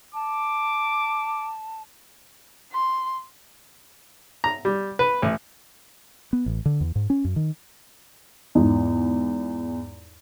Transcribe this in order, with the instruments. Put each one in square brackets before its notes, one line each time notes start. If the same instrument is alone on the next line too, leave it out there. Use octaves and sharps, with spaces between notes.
[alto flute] A5 [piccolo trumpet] D6
[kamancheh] C6
[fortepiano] A#5
G3
B4
A1
[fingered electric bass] B3
A1
D3
E2
G#2
C#4
F#2
D#3
[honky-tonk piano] E2 G#2